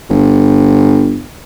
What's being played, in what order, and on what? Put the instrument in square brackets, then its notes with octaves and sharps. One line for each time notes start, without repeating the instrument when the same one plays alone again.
[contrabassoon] G1